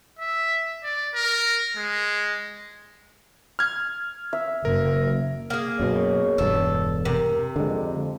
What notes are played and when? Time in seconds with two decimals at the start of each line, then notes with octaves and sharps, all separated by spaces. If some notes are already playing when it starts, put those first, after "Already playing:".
0.19 E5
0.84 D5
1.15 A#4
1.77 G#3
3.59 F6 G#6
4.33 E5
4.65 F#1 F#2 A#4
5.50 A#3 G#4
5.80 F#2 B2 C#5
6.38 E1 G2 A4
7.05 C3 A#4
7.56 F2 D3 G#3